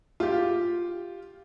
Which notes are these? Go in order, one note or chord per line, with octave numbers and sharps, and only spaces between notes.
F4 G4